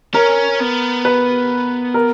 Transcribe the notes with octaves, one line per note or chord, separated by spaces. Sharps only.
C#4 A#4
B3
B4
A#4